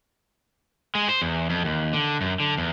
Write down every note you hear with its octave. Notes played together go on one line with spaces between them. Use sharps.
G#3
C5
E2
F2
D#2
D3
F#2
D3
E2